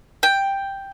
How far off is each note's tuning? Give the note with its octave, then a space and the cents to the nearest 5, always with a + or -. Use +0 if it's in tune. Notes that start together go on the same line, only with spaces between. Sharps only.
G5 +5